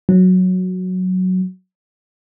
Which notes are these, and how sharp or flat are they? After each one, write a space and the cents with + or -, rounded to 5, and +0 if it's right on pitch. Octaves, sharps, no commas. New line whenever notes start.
F#3 -5